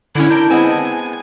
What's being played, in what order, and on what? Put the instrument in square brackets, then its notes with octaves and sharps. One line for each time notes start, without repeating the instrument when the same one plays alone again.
[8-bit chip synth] D3 C#4 [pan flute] E4
[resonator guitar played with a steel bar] A2 D4 A#4 [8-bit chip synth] G6
[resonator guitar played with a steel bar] G#3 B3 C4 [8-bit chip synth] G#5